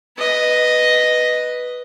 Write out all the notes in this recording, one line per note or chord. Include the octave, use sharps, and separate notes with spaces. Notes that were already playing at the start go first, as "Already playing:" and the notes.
B4 D#5